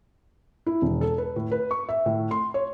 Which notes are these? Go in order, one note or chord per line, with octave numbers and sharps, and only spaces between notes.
E4
E1
A4
B4
A2
B4
C#6
E5
A2
C6
C#5